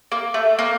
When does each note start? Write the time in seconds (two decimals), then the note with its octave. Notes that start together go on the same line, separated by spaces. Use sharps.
0.12 A#3
0.34 A3
0.59 A#3